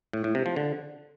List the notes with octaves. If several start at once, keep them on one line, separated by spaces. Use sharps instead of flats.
A2
A2
C3
F3
D3